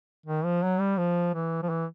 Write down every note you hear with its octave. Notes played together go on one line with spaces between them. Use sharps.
D#3
F3
F#3
G3
F3
E3
F3
E3